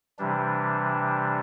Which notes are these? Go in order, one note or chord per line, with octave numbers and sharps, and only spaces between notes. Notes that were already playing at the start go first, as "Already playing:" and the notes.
C3 E3 G3 D4